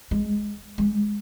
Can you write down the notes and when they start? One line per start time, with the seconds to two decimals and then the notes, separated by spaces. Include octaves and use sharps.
0.11 G#3
0.78 G#3